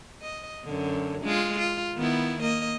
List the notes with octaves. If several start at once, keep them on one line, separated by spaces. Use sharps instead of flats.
D#5
F#2 D3
G#3 F4
F4
D#3 B3 E4
A#3 D#5